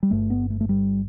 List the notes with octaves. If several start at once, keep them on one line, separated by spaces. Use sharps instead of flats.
G3
G1 G2 A3
B3
A3
A3
G3